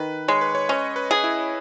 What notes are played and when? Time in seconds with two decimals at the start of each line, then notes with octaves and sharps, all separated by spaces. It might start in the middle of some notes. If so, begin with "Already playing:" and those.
Already playing: D#3 B4
0.28 G#3 C#5
0.41 B4
0.55 C#5
0.69 C#4 D#5
0.96 B4
1.11 G#4
1.24 E4